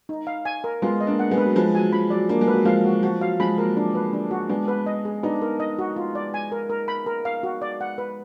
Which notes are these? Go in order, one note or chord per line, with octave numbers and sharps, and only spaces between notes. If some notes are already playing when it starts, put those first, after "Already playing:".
D#4
F5
G#5
A#4
G#3 B3 F4
D#5
A#3 D4
F#5
G#3 B3
B4
F#3
F3 G#3 B4
F#3 G#5
F3 B5
F#3 D5
A#3 D4
G#3
B4
F#3
F3 G#3 F5
F#4
F3 F#4
F#3 F5
F3 G#3 B5
F#3 A#3 A#4
D4
B4
D4
F#4
G#3 B3 D4
B4
D#5
G#4
B3 D4 D#4
A#4
D#5
F#4
F4
D5
G#5
A#4
A#4
B5
A#4
F5
F#4
D5
F#5
B4